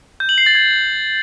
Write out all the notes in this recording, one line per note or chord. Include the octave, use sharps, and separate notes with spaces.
G6
F#7
C7
A6
G#6